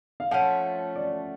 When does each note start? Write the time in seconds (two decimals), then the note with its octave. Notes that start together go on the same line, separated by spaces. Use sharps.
0.20 F5
0.31 F3 A3 C#4 F#5
0.96 D5